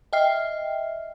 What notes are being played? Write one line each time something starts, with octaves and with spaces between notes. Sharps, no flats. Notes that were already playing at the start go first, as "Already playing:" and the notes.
D#5 E5 G5 F6 C7